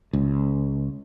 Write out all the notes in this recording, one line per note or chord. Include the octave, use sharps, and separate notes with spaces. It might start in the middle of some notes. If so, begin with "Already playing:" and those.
C#2